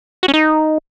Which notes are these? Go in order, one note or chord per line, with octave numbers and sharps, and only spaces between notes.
F#4
C#4
D#4